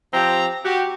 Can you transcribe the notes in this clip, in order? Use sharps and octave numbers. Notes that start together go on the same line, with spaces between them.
F3 C4 G4 A#5
F#4 G4